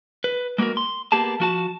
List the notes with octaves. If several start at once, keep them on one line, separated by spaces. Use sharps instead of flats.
B4
G#3 A#3 B3 F#4 A#4
C6
A#3 B3 G4 G#4 A5
F3 F#4 A5